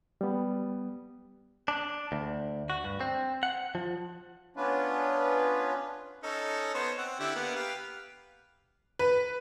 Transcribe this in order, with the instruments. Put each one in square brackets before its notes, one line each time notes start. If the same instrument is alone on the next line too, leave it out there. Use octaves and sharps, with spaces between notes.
[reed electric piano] G3 B3
[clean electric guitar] D4
D2
F#4
G2
C4
F#5
F3
[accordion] B3 C#4 D4 F4 B4
[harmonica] C#4 D#4 A4
B3 C5 C#5
C4 F#5
D3 E4 G4
A#3 B3 F#5
G4 B4 F5
[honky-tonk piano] B4